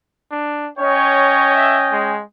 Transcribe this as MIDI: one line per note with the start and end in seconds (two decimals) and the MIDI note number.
0.31 0.69 62
0.78 2.16 61
0.78 1.50 73
0.78 2.16 75
0.78 2.16 79
1.55 1.77 76
1.92 2.22 56